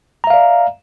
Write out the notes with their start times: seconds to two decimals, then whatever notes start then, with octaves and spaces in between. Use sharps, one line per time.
0.24 A#5
0.27 E5
0.30 F5
0.34 D5